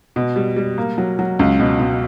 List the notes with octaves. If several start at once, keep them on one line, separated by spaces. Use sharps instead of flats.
B2
G3
G3
A#3
F#3
F#3
C#2
B2
B2